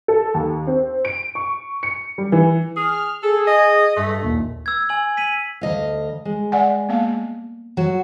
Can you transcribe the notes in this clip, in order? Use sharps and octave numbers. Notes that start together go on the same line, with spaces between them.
A4
D#2
C4
D7
C#6
C#7
G3
E3
G#4 F6
G#4 A4
D#5
G2 A3
A#1 D#2 A#2
E6 G#6
G#5 E6 F#7
B6 D#7 F#7
D2 D#5 F5
G#3
D5 F#5 G#5
A#3 B3 F5
F#3 F#4